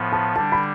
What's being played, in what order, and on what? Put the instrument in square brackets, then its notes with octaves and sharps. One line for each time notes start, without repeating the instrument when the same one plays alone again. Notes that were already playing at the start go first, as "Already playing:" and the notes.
Already playing: [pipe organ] A2 F3 B3
[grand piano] A5
[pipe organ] D3 G3 D4 [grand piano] A5
[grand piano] B5